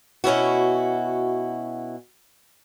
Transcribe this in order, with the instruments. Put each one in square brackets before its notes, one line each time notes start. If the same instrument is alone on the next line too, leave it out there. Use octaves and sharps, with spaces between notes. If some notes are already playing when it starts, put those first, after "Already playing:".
[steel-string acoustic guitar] B2 C#4 E4 F#4